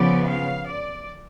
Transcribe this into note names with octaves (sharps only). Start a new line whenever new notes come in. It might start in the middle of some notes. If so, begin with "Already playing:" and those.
Already playing: C#3 F3 B3 D5
F5
D5